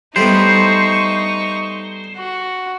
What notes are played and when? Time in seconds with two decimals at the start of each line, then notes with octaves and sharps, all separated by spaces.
0.16 G3 A3 B3 D#4 C5 C#6
2.16 F#4